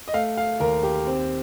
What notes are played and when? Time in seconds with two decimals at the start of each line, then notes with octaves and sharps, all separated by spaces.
0.08 D#5
0.14 A3 F5
0.37 F5
0.60 D#2 A#4
0.83 G4
1.07 C4